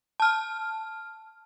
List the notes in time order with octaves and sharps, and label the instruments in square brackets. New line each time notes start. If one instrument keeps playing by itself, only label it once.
[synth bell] A5 F6